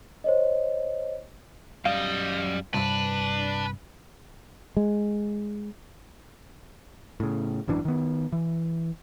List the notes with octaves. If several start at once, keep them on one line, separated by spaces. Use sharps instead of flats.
C5 C#5 D#5
F#2 G3 D#5 F5
C2 G2 D4 B4
G#3
A2 C#3
G#1 F#2 E3 D4
D#3 B3
E3